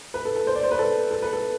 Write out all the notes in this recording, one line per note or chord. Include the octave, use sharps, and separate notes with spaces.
B4
A4
A4
C5
D5
C5
B4
A4
A4
B4
A4